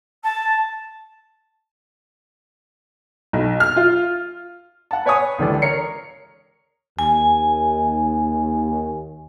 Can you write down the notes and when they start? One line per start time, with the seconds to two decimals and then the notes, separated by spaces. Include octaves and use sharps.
0.23 A5
3.33 B1
3.60 F6
3.76 F4
4.91 F#5 A5
5.06 B4 C#5 G#5 C#6 D#6
5.39 C#2 D3 E3 G4 A4 D5
5.62 A#4 C#5 C7 C#7
6.99 D#2 G#5